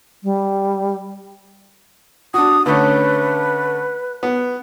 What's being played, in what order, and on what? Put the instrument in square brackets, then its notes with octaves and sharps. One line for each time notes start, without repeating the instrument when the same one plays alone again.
[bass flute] G3
[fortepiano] D4 F#4 [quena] D#6
[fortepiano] D3 A3 C#4 [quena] B4
[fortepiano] B3